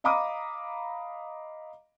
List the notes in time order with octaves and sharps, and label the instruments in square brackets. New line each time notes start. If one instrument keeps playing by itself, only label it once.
[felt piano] D#5 F5 A#5 B5 D6 D#6